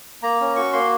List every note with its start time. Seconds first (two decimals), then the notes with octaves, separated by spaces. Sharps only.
0.23 A#3 A#5
0.40 C#4
0.56 F#4 C#6
0.73 A#3 C6